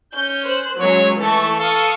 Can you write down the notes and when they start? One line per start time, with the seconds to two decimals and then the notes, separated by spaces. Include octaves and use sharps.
0.16 C#4 G6
0.45 C5 F#6
0.80 F#3 G#3 C#4 C#5
1.19 E3 A3 A4 C#6
1.60 A4 F5 C#6 D#6